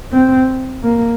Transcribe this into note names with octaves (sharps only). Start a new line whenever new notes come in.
C4
A#3